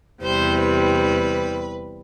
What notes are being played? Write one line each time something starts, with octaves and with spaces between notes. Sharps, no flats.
E2 C3 G3 C5
B4